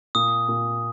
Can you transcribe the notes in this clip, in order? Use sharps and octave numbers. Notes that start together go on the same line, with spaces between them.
A#2 D#6
A#2